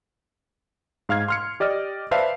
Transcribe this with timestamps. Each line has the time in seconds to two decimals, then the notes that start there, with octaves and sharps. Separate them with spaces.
1.09 G#2 F5 F6 G#6
1.28 C6 F6 C#7
1.60 G4 D5 D#5 F6
2.11 B4 C5 D5 E5 F5 A5